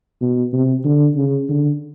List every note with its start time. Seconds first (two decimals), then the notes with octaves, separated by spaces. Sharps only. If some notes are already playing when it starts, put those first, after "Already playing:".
0.21 B2
0.53 C3
0.84 D3
1.16 C#3
1.49 D3